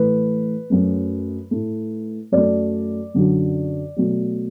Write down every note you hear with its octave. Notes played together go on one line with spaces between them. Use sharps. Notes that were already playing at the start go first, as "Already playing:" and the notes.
Already playing: A2 E3 A3 B4
F#2 F#3 A3
A2 A3
F#2 F#3 A3 D5
F#2 D3 F#3
B2 F#3 A3